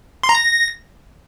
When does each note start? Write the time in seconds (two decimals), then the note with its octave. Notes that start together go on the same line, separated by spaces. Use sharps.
0.23 C6
0.29 A#5
0.35 A#6